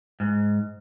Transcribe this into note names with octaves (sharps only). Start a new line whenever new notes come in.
G#2